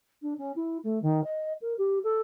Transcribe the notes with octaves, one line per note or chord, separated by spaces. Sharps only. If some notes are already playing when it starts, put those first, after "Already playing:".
D4
C#4
E4
A3
D#3
D#5
A#4
G4
A4